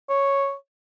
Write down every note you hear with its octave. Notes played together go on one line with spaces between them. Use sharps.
C#5